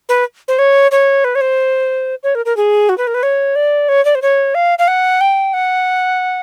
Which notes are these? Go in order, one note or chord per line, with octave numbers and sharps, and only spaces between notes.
B4
C5
C#5
C#5
B4
C#5
C5
C#5
A#4
A#4
G#4
F#4
B4
A#4
B4
C#5
D5
C#5
D5
C5
C#5
F5
F5
F#5
G5
F#5